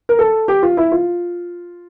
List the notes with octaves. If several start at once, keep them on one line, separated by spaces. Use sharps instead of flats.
A#4
A4
G4
F4
E4
F4